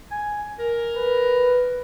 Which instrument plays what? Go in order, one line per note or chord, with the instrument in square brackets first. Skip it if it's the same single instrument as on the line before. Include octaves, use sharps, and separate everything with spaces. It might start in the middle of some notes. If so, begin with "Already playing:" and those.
[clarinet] G#5
A#4
[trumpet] B4